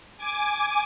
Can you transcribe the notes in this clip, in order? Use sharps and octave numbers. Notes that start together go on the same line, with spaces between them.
G#5 D6